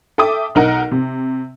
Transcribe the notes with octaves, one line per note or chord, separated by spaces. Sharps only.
A4 E5 G5 D6 D#6
B1 D#4 A#4 F#5
C3